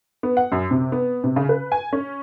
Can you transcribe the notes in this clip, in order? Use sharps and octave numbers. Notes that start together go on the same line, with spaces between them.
B3
F#5
F#2
C3
B3
C3
C#3
B4
G#5
C#4